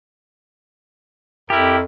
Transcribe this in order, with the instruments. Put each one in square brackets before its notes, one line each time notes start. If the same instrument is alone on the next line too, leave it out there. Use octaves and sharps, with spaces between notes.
[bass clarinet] F2 [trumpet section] E4 A#4 [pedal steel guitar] G4